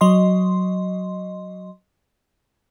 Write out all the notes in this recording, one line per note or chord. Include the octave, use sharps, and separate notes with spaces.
F#3 D#5 C6